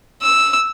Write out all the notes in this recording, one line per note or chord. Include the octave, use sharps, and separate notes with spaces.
E6